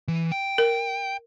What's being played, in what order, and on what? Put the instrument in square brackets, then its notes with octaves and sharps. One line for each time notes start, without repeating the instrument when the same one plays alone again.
[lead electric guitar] E3
G5
[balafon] A#4